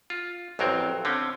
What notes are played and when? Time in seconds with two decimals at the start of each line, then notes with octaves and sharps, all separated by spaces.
0.10 F4
0.59 A1 F2 F#3 C4 A#4
1.05 D3 C4 C#4